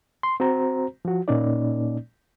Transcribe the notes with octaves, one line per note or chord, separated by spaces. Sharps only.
C6
C4 F#4 C5 A#5
F3 F#4
A#2 A#3 C#4 D#4 D5